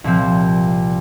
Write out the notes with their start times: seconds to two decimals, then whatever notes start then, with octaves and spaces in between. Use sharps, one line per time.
0.04 C2 A#2 F3 C4